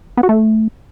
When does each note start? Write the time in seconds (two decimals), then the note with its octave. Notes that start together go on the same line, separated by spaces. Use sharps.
0.17 B3
0.23 F#4
0.29 A3